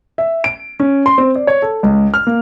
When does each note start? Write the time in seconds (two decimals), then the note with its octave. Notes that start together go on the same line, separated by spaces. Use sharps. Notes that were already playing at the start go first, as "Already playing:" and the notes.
0.18 E5
0.44 D7
0.80 C#4
1.06 C6
1.18 C4
1.35 D5
1.47 C#5
1.62 A4
1.83 C#2
2.14 F6
2.27 A#3